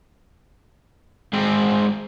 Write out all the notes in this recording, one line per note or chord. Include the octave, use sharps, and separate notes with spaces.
G#2 C4